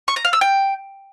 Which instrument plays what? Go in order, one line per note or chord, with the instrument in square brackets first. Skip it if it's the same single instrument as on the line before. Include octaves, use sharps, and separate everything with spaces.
[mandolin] C#6
A#5
F5
E6
G5